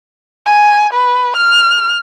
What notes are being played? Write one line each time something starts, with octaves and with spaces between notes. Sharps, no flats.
G#5
B4
F6